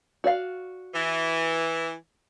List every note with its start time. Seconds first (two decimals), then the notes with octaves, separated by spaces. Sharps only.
0.24 F#4 D5 F5
0.94 E3